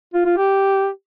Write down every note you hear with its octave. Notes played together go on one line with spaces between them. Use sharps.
F4
F4
G4